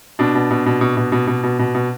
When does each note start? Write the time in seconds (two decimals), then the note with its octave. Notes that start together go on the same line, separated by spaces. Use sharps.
0.19 B2 D4
0.35 B2
0.51 B2
0.66 B2
0.81 B2
0.97 B2
1.12 B2
1.27 B2
1.44 B2
1.59 B2
1.75 B2